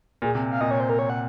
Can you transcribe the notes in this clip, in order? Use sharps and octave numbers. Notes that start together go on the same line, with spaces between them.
A#2 G#4
C3
F5
A#2 D#5
C#5
C5
A#4
C#5
F#5